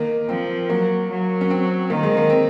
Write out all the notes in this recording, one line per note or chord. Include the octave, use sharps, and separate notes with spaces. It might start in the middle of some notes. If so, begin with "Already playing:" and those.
Already playing: D#3 A#3
F3 C4
F#3 A#3
F#3
C#4
C4
D#3 A#3
G#3
A#3
C4